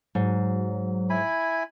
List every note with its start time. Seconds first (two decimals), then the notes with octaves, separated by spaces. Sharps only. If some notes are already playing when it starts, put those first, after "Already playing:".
0.15 G#2 F#3
1.10 E4 G#5 B5